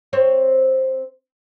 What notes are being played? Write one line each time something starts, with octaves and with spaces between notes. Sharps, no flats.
C4 C5 C#5